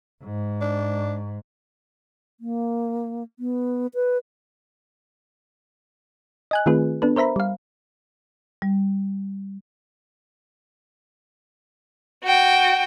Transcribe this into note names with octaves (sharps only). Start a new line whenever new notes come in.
G#2
D4
A#3
B3
B4
D#5 G#5 F#6
D#3 A3 C4 F4 G#4 B4
B3 D4 A4 B4
A#4 C5 E5 A#5 B5
G3 F5
G3
F#4 G5